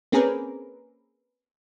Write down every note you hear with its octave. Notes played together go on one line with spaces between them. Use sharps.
A#3 C4 C#4 G#4 A#4 B4